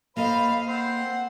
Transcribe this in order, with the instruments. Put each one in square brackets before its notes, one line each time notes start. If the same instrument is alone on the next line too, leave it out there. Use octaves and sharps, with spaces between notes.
[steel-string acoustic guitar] A#3 A4 D#5 [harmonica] C5 B5 [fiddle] F5
[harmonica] C4 C5 [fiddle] F#5